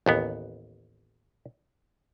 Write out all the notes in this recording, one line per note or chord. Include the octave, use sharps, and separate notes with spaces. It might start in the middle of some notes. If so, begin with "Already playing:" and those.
A1 D#2 B3